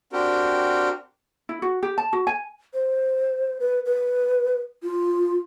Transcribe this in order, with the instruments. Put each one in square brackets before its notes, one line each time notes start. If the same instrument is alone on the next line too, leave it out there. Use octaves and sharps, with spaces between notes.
[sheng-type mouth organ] C4 D4 F#4 G4 A#4 G5
[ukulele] E4
F#4
G4
A5
F#4
G#5
[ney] C5
B4
B4
F4